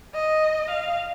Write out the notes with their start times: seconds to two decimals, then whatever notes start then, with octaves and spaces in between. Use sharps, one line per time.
0.14 D#5
0.70 F5